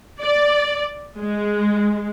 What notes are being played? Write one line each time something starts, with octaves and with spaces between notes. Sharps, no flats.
D5
G#3